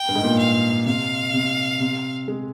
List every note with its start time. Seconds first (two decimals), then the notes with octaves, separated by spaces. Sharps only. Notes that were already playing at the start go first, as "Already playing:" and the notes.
Already playing: G5
0.09 G2
0.15 G#2
0.24 A#2
0.39 F5
0.86 C3 F5
1.34 C3
1.80 C3
2.28 G#3